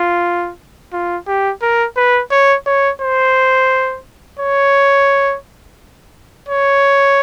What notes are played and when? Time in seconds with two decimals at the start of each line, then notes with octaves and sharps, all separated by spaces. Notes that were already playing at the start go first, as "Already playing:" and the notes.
Already playing: F4
0.93 F4
1.27 G4
1.62 A#4
1.97 B4
2.31 C#5
2.66 C#5
3.01 C5
4.39 C#5
6.49 C#5